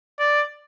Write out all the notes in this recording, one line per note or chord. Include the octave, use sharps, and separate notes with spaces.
D5